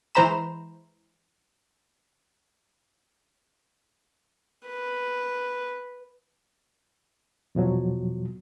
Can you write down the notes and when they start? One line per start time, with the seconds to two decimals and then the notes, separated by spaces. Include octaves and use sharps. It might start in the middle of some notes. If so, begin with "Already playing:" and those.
0.15 E3 G#3 C5 A#5 B5 E7
4.67 B4
7.55 E2 B2 F3 F#3